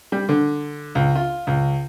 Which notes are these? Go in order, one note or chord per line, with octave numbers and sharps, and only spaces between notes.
G3
D3
C#2
F4
C#2